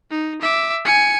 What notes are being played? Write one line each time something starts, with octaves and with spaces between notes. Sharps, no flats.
D#4
E5 D6
G#5 C#7